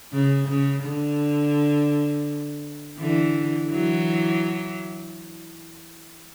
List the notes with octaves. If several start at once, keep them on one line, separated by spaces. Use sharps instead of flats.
C#3
C#3
D3
D3 E3
E3 F#3